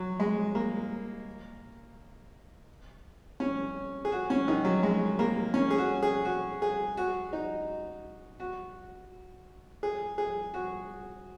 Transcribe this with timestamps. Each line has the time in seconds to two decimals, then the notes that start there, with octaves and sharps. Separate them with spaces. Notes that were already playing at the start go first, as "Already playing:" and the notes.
Already playing: F#3
0.20 G#3
0.55 A#3
3.40 C#4
4.05 G#4
4.12 F#4
4.30 C#4
4.48 D#3
4.65 F#3
4.83 G#3
5.19 A#3
5.54 C#4
5.71 G#4
5.78 F#4
6.03 G#4
6.25 F#4
6.62 G#4
6.97 F#4
7.33 D#4
8.40 F#4
9.83 G#4
10.18 G#4
10.54 F#4